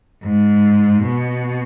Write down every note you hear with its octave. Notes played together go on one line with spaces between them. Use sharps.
G#2
B2